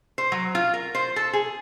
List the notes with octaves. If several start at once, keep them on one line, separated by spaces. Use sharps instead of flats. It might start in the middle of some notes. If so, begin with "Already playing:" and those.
C5
F#3
F4
A#4
C5
A4
G#4